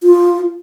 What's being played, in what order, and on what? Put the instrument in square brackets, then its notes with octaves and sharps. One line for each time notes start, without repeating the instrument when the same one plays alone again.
[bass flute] F4